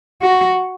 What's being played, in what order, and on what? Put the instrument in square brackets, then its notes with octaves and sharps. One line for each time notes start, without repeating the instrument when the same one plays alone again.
[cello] F#4